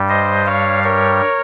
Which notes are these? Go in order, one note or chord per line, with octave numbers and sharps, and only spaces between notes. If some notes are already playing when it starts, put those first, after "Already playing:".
Already playing: G2 G3
C5 D#5
C#5 F5
A#4 C#5